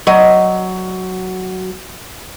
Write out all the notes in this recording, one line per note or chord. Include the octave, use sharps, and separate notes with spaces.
F#3 D#5